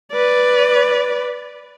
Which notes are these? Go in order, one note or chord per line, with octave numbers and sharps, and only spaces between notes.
B4 D5